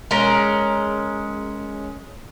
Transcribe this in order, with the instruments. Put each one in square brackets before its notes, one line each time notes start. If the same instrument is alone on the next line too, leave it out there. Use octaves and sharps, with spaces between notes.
[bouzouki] G#3 C#4 A#4